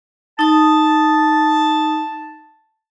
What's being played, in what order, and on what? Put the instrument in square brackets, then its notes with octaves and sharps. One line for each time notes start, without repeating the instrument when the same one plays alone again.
[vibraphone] D#4 D#6 [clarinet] A5